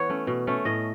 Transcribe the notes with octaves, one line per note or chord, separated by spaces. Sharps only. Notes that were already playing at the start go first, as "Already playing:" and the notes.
Already playing: E3 B3 B4 C#5
A3 C#4
B2
A3 C#4
A2 D#5